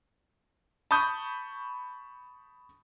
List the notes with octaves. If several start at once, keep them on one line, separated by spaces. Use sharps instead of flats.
A5 B5 C#6 D#6 G6